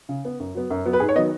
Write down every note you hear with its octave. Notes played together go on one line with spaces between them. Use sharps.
C#3
B3
F#2
F#3 B3
F#2
F#3 B3
B4
G#2 G#4
C#5
D#3 F#3 B3 D#5